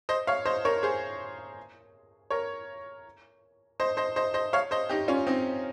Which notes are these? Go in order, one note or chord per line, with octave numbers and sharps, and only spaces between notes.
C5 D#5
C#5 F5
C5 D#5
A#4 C#5
G#4 C5
A#4 C#5
C5 D#5
C5 D#5
C5 D#5
C5 D#5
C#5 F5
C5 D#5
D#4 G4
C#4 F4
C4 D#4